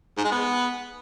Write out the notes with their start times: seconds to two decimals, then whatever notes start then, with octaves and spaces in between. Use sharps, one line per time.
0.17 G#2
0.25 G#3
0.32 B3